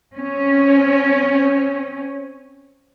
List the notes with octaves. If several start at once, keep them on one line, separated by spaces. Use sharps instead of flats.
C4 C#4